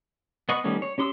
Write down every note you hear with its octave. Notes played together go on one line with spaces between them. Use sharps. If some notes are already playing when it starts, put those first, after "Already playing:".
B3 D#5 F#5 C#6
D#3 G3 A3 B3 C#4
C#5
C#4 G4 C6 D#6 E6